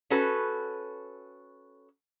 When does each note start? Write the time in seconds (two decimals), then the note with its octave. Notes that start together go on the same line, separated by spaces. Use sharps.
0.10 C#4 F#4 A4 B4